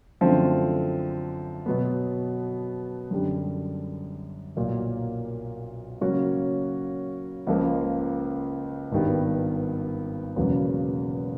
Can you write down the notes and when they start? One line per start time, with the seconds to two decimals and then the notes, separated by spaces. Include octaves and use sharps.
0.21 F#2 D3 F3 A3 C4
1.66 B2 F#3 B3
3.11 F#2 D3 G3
4.56 B1 A#2 F#3 A#3
6.01 C#3 F#3 A#3 C#4 F#4
7.47 C#2 C#3 F3 A#3
8.92 G#1 G2 D#3 G3 B3
10.36 E1 E2 C#3 F#3 A#3